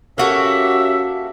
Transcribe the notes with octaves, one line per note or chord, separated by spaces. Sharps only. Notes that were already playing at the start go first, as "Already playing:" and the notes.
A#3 C#4 F#4 G4 A4 E5